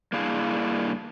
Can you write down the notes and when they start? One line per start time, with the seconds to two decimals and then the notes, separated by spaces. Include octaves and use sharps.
0.13 G2 A#3 D4 E4 G#4 F5